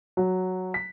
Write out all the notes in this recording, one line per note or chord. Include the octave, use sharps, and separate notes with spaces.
F#3
B6